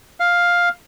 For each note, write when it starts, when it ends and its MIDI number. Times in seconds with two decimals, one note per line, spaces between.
0.20 0.69 77